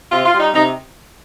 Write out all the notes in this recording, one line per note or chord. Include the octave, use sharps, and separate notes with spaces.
C3 F4
F4
G3
D#4
C3 D#4